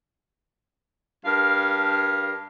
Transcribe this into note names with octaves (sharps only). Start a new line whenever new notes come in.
G2 A#4 F5